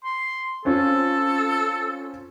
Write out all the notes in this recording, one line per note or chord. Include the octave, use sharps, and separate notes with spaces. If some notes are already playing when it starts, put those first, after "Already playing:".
C6
C4 C#4 F4 A4